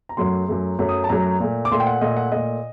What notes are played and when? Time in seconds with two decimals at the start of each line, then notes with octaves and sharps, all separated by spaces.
0.09 A#5
0.17 F#2 F#3 A3 C6
0.48 F#2 F#3 A3
0.79 F#2 F#3 A3
0.89 D#6
1.04 A5
1.09 F#2 F#3 A3 A#5
1.40 A#2 A3
1.65 D6
1.71 A#2 A3 C6
1.80 G5
1.87 F#5
2.01 A#2 A3 D#5
2.17 F#5
2.32 A#2 A3 D#5